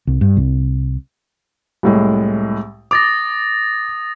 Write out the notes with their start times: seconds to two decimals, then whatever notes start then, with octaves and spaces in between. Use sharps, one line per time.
0.07 C2
0.21 G2
0.37 C2
1.83 C2 A2 G#3
2.91 D6 D#6 A6 A#6